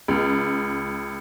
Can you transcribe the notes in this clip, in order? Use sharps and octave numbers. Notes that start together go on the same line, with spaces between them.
C#2